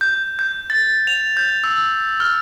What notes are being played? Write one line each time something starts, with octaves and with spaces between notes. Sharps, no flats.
G6
G6
A6
F7
G6
E6
F6